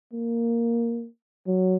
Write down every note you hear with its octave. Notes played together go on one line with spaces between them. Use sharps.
A#3
F#3